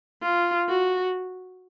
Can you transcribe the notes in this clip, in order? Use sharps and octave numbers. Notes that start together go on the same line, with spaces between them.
F4
F#4